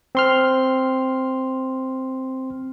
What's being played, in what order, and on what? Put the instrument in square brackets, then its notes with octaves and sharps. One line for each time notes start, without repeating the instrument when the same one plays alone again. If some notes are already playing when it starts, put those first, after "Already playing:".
[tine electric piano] C4 C6 F6